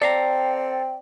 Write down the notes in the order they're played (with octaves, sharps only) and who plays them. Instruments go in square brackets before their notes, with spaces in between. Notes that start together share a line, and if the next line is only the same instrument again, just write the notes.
[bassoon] C4 [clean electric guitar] A4 F5 A#5 [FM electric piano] D5 [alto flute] G5